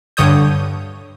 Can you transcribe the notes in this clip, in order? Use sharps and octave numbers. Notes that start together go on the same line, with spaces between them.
G2 D3 C#5 D#6 G6